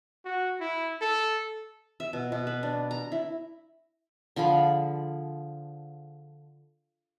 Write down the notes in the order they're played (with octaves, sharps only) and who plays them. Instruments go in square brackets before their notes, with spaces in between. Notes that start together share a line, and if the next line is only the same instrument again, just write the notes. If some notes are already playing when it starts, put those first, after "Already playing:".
[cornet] F#4
E4
A4
[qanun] E5
B2
B2
B4
D4
A#5
E4
D3 F3 G#4 B5